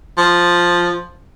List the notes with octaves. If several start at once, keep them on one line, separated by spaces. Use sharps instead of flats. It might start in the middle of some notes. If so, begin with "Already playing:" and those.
F3